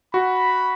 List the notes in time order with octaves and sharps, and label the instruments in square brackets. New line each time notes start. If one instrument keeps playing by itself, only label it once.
[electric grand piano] F#4 [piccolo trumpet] B5